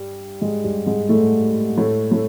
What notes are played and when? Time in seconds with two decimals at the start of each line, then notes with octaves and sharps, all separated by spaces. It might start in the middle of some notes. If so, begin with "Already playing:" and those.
Already playing: G2 G3
0.41 G#2 G#3
0.64 G2 G3
0.86 G#2 G#3
1.09 A2 A3
1.77 A2 A3
2.12 A2 A3